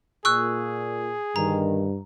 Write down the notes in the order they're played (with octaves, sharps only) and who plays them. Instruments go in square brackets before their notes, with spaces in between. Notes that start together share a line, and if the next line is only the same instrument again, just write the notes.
[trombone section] A#2 [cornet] G#4 [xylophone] C#6 E6 F#6
[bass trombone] G2 [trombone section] D3 D#3 [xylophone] A#5